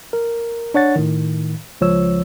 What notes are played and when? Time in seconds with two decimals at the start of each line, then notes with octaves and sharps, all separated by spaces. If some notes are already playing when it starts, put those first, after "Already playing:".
0.13 A#4
0.74 D4 C#5 F#5 A6
0.96 A2 D#3
1.81 C#2 F3 C#5 E6